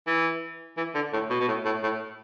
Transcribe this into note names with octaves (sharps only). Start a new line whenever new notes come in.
E3
E3
D3
A2
B2
B2
A2
A2
A2